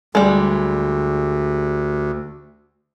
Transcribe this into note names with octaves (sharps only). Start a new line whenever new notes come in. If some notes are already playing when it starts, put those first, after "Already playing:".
D2 G3 G#3